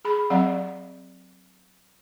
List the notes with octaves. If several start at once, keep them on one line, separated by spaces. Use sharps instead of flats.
G#4 B5
F#3 C4 D5 F5 F#5